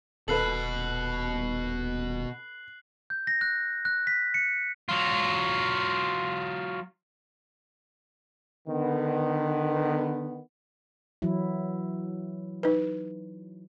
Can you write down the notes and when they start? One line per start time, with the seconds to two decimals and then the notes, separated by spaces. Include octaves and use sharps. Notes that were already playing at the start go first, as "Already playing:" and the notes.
0.28 D#1 B2 A4 B4 F#6 C7 F#7
3.10 G6
3.27 A#6
3.41 F#6
3.85 F#6
4.07 B6
4.34 C#7
4.89 F#3 F4
8.68 D3 D#3 B3
11.22 E3 F#3 E4
12.63 D#4 B4